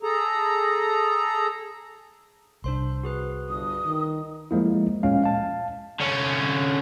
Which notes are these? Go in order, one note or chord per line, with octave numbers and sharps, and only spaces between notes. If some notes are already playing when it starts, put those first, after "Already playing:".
G#4 A4 A#5
C2 D4 C5 C6
F#4 G#4 B4
G1 G2 D#6
D#3
F3 G#3 A#3 E4
A#2 G#3 C#4 F5
F5 A5
D3 C#4